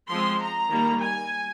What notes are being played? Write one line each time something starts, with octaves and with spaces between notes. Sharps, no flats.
F3 G#3 C4 C6
A#5
D#3 G3 A#3
G#5